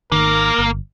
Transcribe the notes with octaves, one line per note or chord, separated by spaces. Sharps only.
G#1 D#3 A#3 A#4
G1